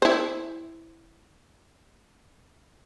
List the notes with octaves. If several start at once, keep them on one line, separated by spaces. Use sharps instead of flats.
E4 C5